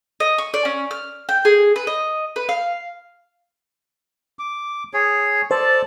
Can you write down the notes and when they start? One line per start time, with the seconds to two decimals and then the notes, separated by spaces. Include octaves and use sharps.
0.20 D#5
0.38 C#6
0.54 D5
0.65 C#4
0.91 F6
1.29 G5
1.45 G#4
1.76 B4
1.87 D#5
2.36 B4
2.49 F5
4.39 D6
4.94 G#4 C#5
5.51 A4 C5 D5 A5